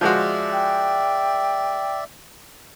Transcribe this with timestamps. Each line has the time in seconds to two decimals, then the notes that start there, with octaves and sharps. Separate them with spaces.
0.01 F3 G#3 F#4 D5 E5
0.53 G5